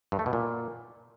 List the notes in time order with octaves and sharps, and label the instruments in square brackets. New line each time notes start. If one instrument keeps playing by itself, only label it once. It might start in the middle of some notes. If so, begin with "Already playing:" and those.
[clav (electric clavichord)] G2
A3
B2
A#2